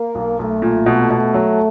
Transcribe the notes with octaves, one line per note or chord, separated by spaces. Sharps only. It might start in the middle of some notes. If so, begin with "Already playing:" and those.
Already playing: A#3
B1
B1 A3
A#2
B2
B2
F#3